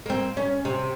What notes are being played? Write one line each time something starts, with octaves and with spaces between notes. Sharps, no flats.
A#3 C4
C#4
C3